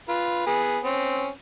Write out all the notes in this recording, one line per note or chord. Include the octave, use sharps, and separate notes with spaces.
F4 B4
B3 G#4
C4 C#4